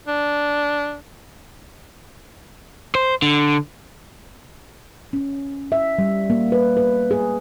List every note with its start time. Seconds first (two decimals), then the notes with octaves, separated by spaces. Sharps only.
0.08 D4
2.95 C5
3.22 D3
5.13 C#4
5.72 E5
5.98 G3
6.30 A#3
6.52 B4
6.77 B4
7.11 G#4